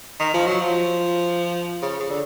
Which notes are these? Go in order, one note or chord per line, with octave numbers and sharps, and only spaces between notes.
D#3
F3
F#3
F3
C#3
C#3
D3